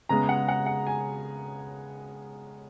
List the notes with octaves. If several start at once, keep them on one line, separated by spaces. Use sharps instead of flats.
C#3 G#3 B3 A#5
F#5
F#5
F#5
G#5